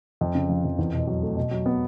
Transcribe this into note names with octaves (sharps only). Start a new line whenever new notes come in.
F2
C#3
F3
F2
E2
B2
F#3
A3
B2
F#3
B3